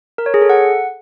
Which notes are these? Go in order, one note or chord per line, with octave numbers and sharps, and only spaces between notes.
A#4
C#5
G#4
A4
F#5